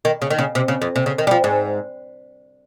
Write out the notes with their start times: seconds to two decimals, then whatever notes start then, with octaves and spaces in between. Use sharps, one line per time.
0.05 D#3
0.22 C#3
0.30 D#3
0.38 C#3
0.55 C3
0.68 C#3
0.82 F2
0.96 C3
1.06 C#3
1.18 D#3
1.27 G3
1.31 F3
1.44 G#2